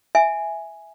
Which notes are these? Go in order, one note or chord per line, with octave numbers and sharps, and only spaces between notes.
E5 G#5